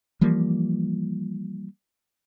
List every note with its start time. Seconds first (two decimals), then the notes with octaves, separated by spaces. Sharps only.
0.21 E3 F3 G3 A#3